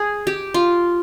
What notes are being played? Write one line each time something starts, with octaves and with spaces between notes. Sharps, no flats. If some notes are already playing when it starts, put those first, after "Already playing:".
Already playing: G#4
G4
F4